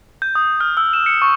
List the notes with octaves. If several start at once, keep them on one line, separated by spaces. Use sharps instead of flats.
G6
D#6
F6
E6
E7
C#7
C#6